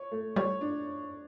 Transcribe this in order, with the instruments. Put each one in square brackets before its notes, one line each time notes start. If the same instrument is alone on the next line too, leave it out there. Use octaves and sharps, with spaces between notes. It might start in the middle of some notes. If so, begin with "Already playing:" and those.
Already playing: [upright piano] C#5
A3
[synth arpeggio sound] G3 [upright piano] C#5
[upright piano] D4